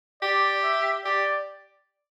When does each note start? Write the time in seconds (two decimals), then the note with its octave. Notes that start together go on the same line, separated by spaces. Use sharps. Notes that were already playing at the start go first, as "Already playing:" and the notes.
0.22 G4 D5
0.64 E5
1.05 G4 D5